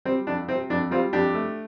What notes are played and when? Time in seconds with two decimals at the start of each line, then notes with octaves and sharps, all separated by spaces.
0.05 G3 C4
0.27 F2 D4
0.48 C3 C4
0.70 F2 D4
0.91 G3 C4 F4
1.13 F2 D4 G4
1.35 A3